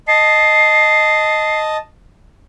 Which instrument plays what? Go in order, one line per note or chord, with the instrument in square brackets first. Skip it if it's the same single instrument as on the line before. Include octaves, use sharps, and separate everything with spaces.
[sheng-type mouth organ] D#5 A5 [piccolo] C7